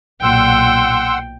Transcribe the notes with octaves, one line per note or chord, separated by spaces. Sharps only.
B1 A#2 F#5 G5 C6 E6